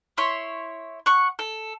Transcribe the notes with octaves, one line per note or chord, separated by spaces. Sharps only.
E4 C#5 C6
F#5 C#6
A4